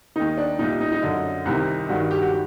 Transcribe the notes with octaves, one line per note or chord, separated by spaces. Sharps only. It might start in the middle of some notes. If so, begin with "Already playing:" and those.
D#2 D#3 D#4
D4
C2 A#2 D#4
D#4
D#4
F#2 D3
C2 C3 D#3
G2 D#3 F#4
G4
F#4